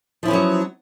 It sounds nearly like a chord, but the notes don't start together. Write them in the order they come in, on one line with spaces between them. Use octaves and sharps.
F3 E4 C#4 B3 F#3